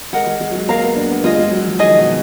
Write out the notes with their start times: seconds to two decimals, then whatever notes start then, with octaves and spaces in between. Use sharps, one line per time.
0.13 G#3 A#4 D#5 F#5
0.27 G#3
0.40 G#3
0.51 F#3
0.55 G#3
0.69 A#3 A#4 F5 A#5
0.83 B3
0.96 D4
1.10 B3
1.24 G#3 F4 G#4 D#5
1.38 G#3
1.51 F#3
1.66 F3
1.79 D#3 G#4 D#5 G#5
1.98 B2